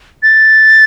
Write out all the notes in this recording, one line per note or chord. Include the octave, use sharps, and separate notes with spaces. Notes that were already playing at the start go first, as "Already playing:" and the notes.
A6